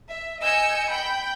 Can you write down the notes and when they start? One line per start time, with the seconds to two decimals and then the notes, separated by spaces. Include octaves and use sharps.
0.10 E5
0.42 D#5 G#5 E6 G6 C#7
0.92 G5 B5 G6